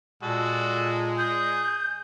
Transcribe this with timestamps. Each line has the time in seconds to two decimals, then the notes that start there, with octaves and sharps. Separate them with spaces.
0.23 A#2 G#3 F#4 A4
1.18 G#4 G6